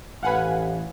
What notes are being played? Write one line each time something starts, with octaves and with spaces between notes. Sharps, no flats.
A1 B4 F5 F#5 G#5 B5